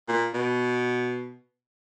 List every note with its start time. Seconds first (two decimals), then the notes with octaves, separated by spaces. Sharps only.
0.08 A#2
0.33 B2